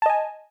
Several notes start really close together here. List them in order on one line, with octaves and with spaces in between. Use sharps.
A5 D#5 G#5